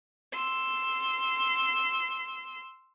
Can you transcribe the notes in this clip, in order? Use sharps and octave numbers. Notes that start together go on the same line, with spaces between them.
C6 E6